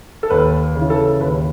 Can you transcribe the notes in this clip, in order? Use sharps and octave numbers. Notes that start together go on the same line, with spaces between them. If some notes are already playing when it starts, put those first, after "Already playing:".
A4
D#2 B4
C#3 E3
A4
D#2 B4